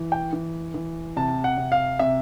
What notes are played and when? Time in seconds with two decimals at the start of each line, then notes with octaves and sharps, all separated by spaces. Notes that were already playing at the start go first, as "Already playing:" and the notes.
Already playing: E3
0.12 G5
0.33 E3
0.74 E3
1.17 C3 A5
1.44 F#5
1.58 C3
1.72 F5
1.99 C3 E5